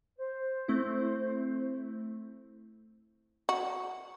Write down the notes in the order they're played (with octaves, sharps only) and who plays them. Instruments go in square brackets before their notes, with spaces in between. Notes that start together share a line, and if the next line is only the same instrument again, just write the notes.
[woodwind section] C5
[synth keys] A3 C4 E4
[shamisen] F#4